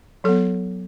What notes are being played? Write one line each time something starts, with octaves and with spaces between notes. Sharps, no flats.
F#3 B3 A4